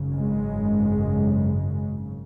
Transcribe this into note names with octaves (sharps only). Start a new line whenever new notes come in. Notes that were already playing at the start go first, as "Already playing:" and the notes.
Already playing: G#1 F#2 C#3
G#3